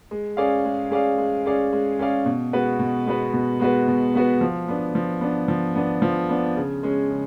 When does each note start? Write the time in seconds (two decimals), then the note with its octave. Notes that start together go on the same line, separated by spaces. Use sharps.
0.11 G#3
0.37 C#4 G#4 D5 F5
0.65 G#3
0.91 C#4 G#4 D5 F5
1.18 G#3
1.46 C#4 G#4 D5 F5
1.73 G#3
1.99 C#4 G#4 D5 F5
2.26 B2
2.53 G#3 B3 F#4 B4
2.79 B2
3.06 G#3 B3 F#4 B4
3.33 B2
3.60 G#3 B3 F#4 B4
3.87 B2
4.14 G#3 B3 F#4 B4
4.41 F3
4.68 B3 D4
4.95 F3
5.21 B3 D4
5.48 F3
5.76 B3 D4
6.02 F3
6.29 B3 D4
6.56 C#3
6.83 G#3 C#4
7.10 C#3